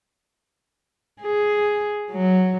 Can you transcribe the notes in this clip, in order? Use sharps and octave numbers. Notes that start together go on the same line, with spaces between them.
G#4
F#3